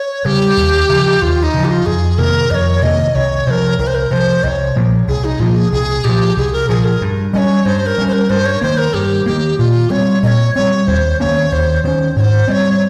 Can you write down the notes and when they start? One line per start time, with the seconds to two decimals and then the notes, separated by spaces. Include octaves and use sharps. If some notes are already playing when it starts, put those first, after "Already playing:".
Already playing: C#5
0.25 C#3 G3 G4
0.57 D#2
0.89 C#3 F3
1.22 D#2 F4
1.43 D#4
1.54 C#3 F3
1.65 G4
1.69 F4
1.86 F2 G#4
2.18 C3 D#3 A#3 A#4
2.51 F2 C#5 D#5
2.82 C3 D#3 A#3 D#5
3.15 C2 C#5
3.47 C3 F3 A#4 C5
3.79 C2 A#4
3.87 C5
3.95 A#4
4.11 C3 F3 C5
4.43 C2 C#5 D#5
4.76 A#2 F3 A#3
5.08 C2 G#4
5.24 D#4
5.39 A#2 F3 A#3 F4
5.56 G#4
5.72 C2 G#4
6.04 A#2 F3 G4
6.37 C2 G#4
6.53 A#4
6.69 A#2 F3 G#4
6.85 A#4
7.01 G2
7.33 G3 C#4 C#5 D#5
7.65 G2 C5
7.86 A#4
7.98 G3 C#4
8.08 C5
8.13 A#4
8.30 G2 C5
8.46 C#5
8.62 D#3 A#3 C5
8.78 A#4
8.94 G2 G4
9.26 D#3 A#3 G4
9.58 A#2 F4
9.90 G3 C4 C#5
10.23 A#2 D#5
10.27 C#5
10.55 G3 C4 C#5
10.87 D#2 C5
11.20 D#3 A#3 C#4 C#5
11.52 D#2 C5
11.84 D#3 A#3 C5
11.87 C#4
12.16 G#2 C#5
12.21 C5
12.48 G3 C4 C#5 D#5